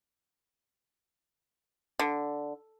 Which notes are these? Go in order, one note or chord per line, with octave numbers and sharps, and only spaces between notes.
D3